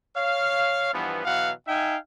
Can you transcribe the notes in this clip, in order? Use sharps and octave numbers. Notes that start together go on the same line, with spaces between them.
C#5 F5
G2 E3 F3 B3
B2 E3 F#3 F5 F#5
D#4 E5 F5 G5 G#5